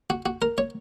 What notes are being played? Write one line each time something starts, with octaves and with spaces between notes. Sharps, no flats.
F#4
F#4
A#4
C#5